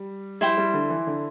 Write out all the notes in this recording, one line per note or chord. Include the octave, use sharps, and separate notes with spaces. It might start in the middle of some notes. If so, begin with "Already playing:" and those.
Already playing: G3
G3 E4 C5 G5
G3
D3
E3
D3